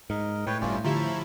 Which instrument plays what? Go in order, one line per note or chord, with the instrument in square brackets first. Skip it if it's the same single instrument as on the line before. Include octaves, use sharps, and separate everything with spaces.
[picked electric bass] G#2 [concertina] A#4 D#5
[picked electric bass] A2 [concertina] B4 C#5 G5 [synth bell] A6
[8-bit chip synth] G1 G2 [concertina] C#4 F4 D5 [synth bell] E5 F5
[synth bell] D3 G4 E7 [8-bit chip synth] F3 E4 [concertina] A#5 B5 C#6